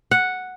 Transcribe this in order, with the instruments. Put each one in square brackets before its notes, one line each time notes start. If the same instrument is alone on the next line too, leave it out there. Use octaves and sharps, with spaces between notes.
[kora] F#5